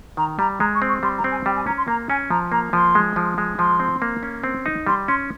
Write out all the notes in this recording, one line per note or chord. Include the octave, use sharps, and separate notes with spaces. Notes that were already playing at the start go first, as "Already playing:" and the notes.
D#3 A#5
G3 A#5
G#3 A#5
C#6
C4
C#6
G3 C6
A#5
C4
G#5
G3 G5
G#5
C#4 A#5
C6
A#3 A#5
C#4 G#5
F3 A#5
A#3 A#5
F3 C6
G#3
F3
G#3
F3 C6
C4
A#3
C#4
C4
D#4
G3 C6
C#4 C6